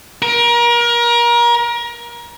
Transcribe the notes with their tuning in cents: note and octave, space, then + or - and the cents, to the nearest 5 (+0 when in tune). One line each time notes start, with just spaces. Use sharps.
A#4 +30